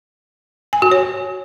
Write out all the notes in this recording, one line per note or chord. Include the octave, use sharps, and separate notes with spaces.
G#5
F#4
C#5